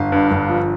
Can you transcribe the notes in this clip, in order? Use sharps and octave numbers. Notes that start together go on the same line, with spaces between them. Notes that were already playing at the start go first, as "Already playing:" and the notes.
Already playing: G1 F5
G2
G1
F3